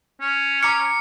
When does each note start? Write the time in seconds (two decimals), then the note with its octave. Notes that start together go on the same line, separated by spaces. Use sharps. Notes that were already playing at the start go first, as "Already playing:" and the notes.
0.21 C#4
0.63 A#5 D6 F6 C#7